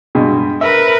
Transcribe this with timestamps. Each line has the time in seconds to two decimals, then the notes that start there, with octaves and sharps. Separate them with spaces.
0.15 G2 B2 G#3
0.61 A#4 B4 E5